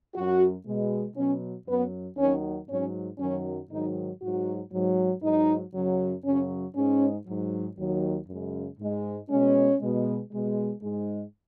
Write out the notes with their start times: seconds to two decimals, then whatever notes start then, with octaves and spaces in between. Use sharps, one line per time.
0.15 F#2 F#3 F#4
0.65 B2 G#3
1.16 B2 F#3 C#4
1.67 F#2 F#3 B3
2.17 D#2 D#3 F#3 C#4
2.68 G#2 F#3 C#4
3.19 F#2 D#3 F#3 C#4
3.70 G#2 D#3 F#3 D#4
4.21 G#2 F#3 F#4
4.72 G#2 F#3
5.22 G#2 F#3 D#4
5.74 F#2 C#3 F#3
6.24 F#2 C#3 F#3 C#4
6.75 G#2 G#3 C#4
7.26 G#2 F#3
7.77 D#2 D#3 F#3
8.27 F#2 C#3 G#3
8.78 G#2 G#3
9.29 B2 G#3 C#4
9.80 B2 G#3
10.31 B2 G#3
10.81 G#2 G#3